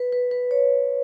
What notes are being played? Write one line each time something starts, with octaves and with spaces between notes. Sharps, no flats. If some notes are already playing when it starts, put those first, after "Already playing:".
Already playing: B4
B4
B4
C#5